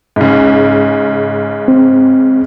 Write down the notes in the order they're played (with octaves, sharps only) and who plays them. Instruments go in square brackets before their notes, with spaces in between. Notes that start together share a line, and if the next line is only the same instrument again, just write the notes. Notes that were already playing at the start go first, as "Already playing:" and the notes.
[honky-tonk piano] G#2 C#3
[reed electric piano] C4